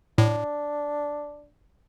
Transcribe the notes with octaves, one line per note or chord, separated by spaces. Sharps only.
A2 D4